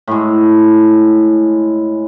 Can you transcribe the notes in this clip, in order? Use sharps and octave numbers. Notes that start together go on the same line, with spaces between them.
A2 G#3